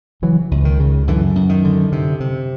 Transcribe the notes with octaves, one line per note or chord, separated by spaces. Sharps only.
C#3 E3 F#3
C#2
D#3
C#3
F#2 D3 E3
F#2
D#3
D3
C3
C3